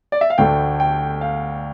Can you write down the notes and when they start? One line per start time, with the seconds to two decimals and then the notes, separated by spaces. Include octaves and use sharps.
0.12 D5
0.21 E5
0.30 F5
0.38 D2 D3 A3 G5
0.80 G5
1.21 F5